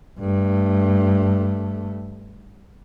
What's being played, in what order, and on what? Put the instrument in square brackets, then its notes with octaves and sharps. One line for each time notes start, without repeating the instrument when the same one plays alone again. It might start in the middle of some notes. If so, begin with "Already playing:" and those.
[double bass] G2 A3